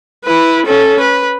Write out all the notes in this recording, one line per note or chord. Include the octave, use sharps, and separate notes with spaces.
E4 B4
C#4 A4
B4